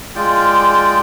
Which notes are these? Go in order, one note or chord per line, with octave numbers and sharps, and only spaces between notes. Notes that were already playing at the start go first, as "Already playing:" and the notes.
G#3 F4 D5 G5